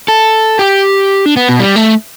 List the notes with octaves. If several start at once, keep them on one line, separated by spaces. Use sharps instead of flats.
A4
G4
D4
B3
B2
G3
A3